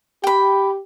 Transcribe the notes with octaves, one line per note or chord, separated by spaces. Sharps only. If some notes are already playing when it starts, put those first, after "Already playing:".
G4 G5 B5